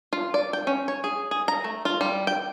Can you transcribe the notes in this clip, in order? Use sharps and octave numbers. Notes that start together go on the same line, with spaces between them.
F4
D5
G5
C#4
C#5
G#4
G#4
A#5
A3
F4
G3
G5